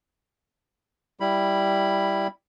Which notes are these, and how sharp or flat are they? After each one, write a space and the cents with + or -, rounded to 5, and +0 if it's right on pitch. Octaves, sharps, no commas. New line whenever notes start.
G3 +0 E4 +0 B5 +0